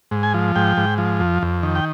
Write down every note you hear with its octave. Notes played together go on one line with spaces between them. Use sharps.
G#2
G#5
F3
G#2 G5
G#2
F3
F2
F2
D#3
G5